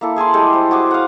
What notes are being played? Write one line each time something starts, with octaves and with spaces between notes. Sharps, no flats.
A#3 E4 A4
G#4 G#5 A5 C6
G3 G#3 G4 A4
C5
F#4 G#4 D6
F5 F#5